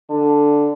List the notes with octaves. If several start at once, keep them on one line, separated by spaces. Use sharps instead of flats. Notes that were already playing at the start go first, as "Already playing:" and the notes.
D3